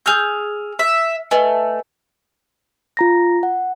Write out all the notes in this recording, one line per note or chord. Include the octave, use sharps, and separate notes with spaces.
G#4 E6 F6 G6 F7
E5
A3 B4 D#5 G#5
F4 A#5 A#6
F#5